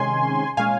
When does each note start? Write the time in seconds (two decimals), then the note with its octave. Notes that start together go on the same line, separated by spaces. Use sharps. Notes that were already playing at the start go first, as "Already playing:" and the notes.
Already playing: C3 D#3 G#3 C#4 G#5 C6
0.57 A#2 G#3 C#4 F5 G#5